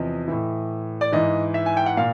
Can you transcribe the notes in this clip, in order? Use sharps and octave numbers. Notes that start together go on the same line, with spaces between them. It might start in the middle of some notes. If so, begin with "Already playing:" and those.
Already playing: E2 C3 F3 D#5
A2 E3
D5
G#2 E3 D#5
E5
G#5
G5
F#5
A#2 F5